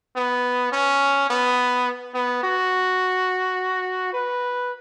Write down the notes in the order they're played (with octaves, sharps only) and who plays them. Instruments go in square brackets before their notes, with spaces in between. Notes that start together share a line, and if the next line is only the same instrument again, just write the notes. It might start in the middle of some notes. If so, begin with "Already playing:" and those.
[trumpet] B3
C#4
B3
B3
F#4
B4